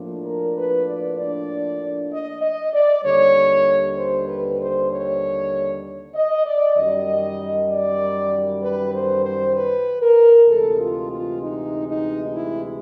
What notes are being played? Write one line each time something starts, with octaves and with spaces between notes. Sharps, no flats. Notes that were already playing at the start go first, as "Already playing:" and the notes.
Already playing: A2 F3 A#3 D4
A#4
B4
D5
D5
D#5
D#5
D5
D#2 D3 G3 C#5
C5
B4
C5
C#5
D#5
D5
F#2 D#3 G3 D#5
D5
B4
C5
C5
B4
A#4
D2 C3 E3 G#3 A4
F4
F4
D#4
D#4
E4